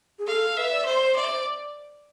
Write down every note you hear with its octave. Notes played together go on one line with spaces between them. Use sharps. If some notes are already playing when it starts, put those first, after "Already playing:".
G#4
A4 F5
B4 E5
D5
C5
D5 E5
C5